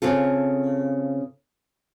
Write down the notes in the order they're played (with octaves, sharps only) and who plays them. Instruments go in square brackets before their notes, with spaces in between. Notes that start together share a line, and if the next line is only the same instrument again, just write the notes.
[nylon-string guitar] C#3 C4 F4 A4